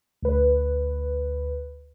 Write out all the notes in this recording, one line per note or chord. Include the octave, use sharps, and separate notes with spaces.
D2 B4